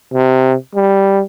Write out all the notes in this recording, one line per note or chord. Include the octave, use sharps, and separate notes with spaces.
C3
G3